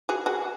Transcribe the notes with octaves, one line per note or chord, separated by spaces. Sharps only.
F#4 G#4
F#4 G#4